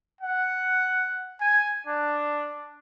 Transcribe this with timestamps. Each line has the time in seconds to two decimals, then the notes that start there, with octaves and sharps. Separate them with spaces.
0.21 F#5
1.41 G#5
1.87 D4